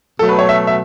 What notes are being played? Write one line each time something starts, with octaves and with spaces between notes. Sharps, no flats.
B2 F#3 A3 A4
B4
C#5
E5
E5